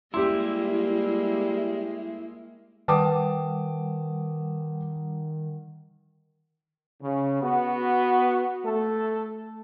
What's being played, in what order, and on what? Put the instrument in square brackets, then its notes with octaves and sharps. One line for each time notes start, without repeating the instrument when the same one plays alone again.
[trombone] G3 [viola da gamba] G#3 A#3 [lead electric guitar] E4 [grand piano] G4 C6
[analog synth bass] D#3 [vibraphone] G3 F#5 [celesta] B4 G5 [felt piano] A5 D6 D#6
[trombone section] C#3
B3 F#4
A3 A4